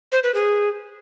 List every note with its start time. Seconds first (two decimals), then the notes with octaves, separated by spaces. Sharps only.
0.12 C5
0.23 B4
0.35 G#4